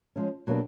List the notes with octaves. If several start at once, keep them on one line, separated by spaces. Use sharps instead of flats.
F3 G#3 C#4
B2 F#3 A#3 D4 G4